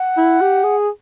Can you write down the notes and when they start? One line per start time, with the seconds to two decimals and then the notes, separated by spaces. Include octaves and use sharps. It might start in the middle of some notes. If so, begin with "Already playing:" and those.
Already playing: F#5
0.17 E4
0.41 G4
0.64 G#4